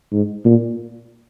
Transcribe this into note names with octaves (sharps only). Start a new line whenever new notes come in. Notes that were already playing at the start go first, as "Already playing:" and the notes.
G#2
A#2